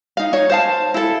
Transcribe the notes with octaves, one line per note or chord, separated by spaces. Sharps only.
D#4 F5
D#4 C#5
C5 F5 A5
E4 A4